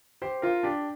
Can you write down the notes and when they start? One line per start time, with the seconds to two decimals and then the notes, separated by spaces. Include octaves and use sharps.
0.22 G4 C5
0.42 F4 A#4
0.63 D4 G4